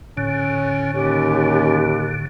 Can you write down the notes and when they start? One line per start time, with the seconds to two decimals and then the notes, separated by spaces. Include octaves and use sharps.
0.17 A2 D3 C#4
0.94 D#2 C#4 G4